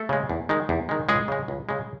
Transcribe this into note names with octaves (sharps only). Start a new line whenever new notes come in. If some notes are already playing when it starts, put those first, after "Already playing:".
Already playing: A3 A4
C#3 G#3
E2
D#3 G#3
E2
D#3 G#3
C#2 G#3 G#4
C#3 G#3
C#2
C#3 G#3